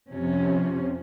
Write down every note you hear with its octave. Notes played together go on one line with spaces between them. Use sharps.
F2 C3 F3 C#4